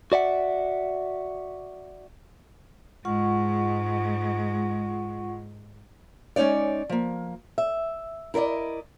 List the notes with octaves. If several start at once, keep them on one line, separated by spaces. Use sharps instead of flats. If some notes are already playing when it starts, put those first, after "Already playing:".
F#4 D5 E5 F#5
G#2 G#3 F4 F#5 C#6
G#3 C#4 D#4 C#5 D5
F3 A#3
E5
E4 A#4 C5 D5 D#5